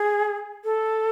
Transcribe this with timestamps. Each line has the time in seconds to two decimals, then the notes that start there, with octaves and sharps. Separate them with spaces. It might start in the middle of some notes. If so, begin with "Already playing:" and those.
Already playing: G#4
0.65 A4